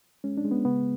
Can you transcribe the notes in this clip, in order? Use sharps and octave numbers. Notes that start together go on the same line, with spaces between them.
G#3 C#4
D4
G#3
B3
C#3 B3